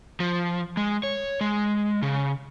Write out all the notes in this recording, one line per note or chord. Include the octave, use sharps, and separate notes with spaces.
F3
G#3
C#5
G#3
C#3